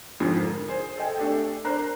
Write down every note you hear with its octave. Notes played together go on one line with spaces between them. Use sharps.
F2 G#2 D3 F3
A#4
G#4 C5
A4 D#5 G5 G#5
A3 D4 G4 A4
D4 A#4 C5 A#5 F#6